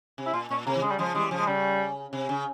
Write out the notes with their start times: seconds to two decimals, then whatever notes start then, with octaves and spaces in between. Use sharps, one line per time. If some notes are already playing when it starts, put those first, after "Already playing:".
0.18 C3
0.26 E4
0.34 A#2 F4
0.51 A#2 C#4
0.66 C3 A#3
0.75 E3
0.82 C#3 G#3
0.91 G3
0.98 C#3 F3 G#3
1.15 E3 G3 G#3
1.31 C#3 F3
1.39 G#3
1.47 C#3 G3
2.13 C3
2.29 C#3